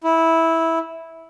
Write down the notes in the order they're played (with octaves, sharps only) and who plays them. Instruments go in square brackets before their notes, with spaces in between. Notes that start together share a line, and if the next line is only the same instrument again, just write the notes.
[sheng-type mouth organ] E4